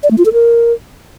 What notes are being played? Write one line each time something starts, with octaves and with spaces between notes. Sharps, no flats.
D5
A3
F4
A4
A#4